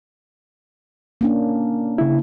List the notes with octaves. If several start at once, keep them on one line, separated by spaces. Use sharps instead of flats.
A#3 C#4 D4
C#3 E4